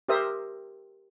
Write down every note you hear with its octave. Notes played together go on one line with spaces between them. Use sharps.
G4 A#4 C5 E5 D#6